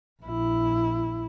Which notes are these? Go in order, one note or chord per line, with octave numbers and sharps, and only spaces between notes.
A#1 E4